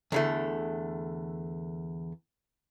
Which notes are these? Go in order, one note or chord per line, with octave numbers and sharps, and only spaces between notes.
E2 D3 A3